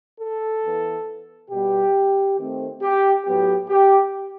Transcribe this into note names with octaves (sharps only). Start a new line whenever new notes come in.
A4
E3 B3
B2 G3 B3 G4
D#3 A3 C4
G4
A2 F#3 B3 G4
G4